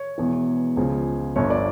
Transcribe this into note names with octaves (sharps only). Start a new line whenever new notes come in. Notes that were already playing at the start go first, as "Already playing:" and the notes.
Already playing: C#5
E1 E2 E3
C#2 C#3 F3
G1 G2 F3 C#5
D5